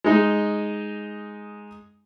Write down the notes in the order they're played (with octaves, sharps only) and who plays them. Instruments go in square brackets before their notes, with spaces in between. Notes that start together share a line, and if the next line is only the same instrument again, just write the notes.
[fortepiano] G#3 D#4